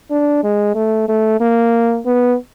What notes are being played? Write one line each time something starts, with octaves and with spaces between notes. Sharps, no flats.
D4
G#3
A3
A3
A#3
B3